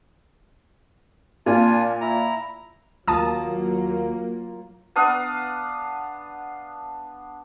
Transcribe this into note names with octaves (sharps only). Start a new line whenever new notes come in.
A#2 D4 F4 G#5
E4 A#5
D#2 F#3 A#3 F4 A5 A#5 D#6
B3 D4 F5 D#6